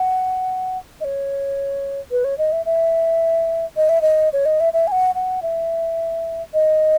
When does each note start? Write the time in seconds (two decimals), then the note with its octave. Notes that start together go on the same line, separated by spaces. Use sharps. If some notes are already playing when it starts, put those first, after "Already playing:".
Already playing: F#5
1.01 D#5
1.04 C#5
2.11 B4
2.24 C#5
2.38 D#5
2.52 E5
2.66 E5
3.77 D#5
3.89 E5
4.02 D#5
4.33 C#5
4.46 D#5
4.60 E5
4.73 E5
4.87 G#5
4.92 F#5
5.15 F#5
5.42 E5
6.54 D#5